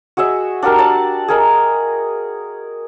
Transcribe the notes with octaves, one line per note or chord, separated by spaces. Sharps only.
F#4 G#4 D#5 E5
D4 F#4 G4 A#4
D5 A5
G#4 A#4 D#5